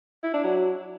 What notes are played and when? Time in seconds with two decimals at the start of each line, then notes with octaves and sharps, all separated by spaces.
0.23 E4
0.34 D4
0.44 F#3